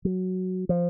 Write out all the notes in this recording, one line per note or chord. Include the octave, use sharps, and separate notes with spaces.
F#3
F3